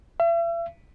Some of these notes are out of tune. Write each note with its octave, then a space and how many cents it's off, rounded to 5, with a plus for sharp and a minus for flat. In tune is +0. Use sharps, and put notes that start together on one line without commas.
E5 +40